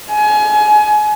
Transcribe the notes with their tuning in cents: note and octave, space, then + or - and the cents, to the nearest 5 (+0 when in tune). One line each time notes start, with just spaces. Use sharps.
G#5 +30